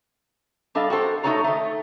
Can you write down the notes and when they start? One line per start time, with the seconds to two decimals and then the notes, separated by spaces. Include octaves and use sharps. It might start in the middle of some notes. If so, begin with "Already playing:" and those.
0.75 G3 D4 A4 D#5 F5
0.90 F#4 G4 A4 C5
1.23 A3 D#4 F#4 A4 C#5 A#5
1.44 D#3 A3